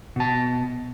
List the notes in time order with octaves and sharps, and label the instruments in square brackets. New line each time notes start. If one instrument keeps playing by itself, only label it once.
[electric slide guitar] B2 A5